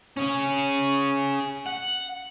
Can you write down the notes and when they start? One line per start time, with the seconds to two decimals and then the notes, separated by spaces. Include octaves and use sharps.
0.17 C#4 G#4
1.66 F#5